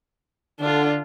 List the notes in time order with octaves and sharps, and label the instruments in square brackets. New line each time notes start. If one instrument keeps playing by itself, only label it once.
[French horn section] D3 [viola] D4 F4